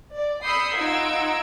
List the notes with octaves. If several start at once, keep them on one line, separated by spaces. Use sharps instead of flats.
D5
B5 D#6 E6 G6 C7 C#7
D#4 F4 F#5 E6 G#6 D7